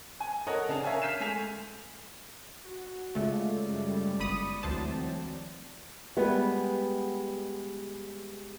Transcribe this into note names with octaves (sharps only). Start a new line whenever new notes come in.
G#5
A4 A#4 C#5 D#5 F#5
C#3 D4 G#4 A5 F7
A#4 C#5 E5 F5 G#5
F6 G6 B6 C7 D#7 E7
G#3 A3 G#5 B6 F7
F#4
C#3 G#3 A3 F4 D5
F#2 G3
G1 B5 D#6 C#7
D2 E3 F#3 C4 C5 A5
G3 G#3 B3